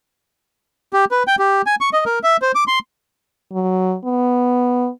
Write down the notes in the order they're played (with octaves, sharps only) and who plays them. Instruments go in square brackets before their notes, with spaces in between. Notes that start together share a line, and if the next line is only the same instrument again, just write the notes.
[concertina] G4
B4
G5
G4
G#5
C#6
D#5
A#4
E5
C5
D6
C6
[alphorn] F#3
B3